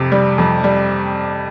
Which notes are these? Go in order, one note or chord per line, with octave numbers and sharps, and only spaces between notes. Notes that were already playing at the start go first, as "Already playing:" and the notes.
Already playing: F2 C3
G3
F2
G3